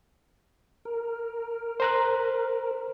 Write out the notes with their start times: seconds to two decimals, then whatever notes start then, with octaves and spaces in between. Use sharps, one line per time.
0.85 A#4
1.80 C5 A#5 F#6